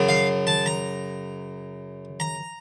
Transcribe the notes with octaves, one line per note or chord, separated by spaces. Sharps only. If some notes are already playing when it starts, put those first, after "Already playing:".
Already playing: F#2 C#3
F5
A5
A#5
A#5